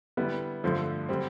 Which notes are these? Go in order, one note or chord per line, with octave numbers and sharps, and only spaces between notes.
D3 G3 B3 E4
G2 D3 F3 A3
D3 G3 C4